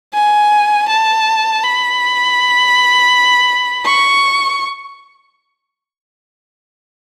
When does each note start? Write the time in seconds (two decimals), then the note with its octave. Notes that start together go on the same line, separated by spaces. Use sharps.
0.14 G#5
0.88 A5
1.63 B5
3.86 C#6